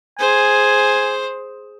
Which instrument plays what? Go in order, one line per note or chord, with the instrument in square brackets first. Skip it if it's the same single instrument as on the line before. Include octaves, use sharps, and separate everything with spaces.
[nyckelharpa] G#4 C5 [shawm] G#5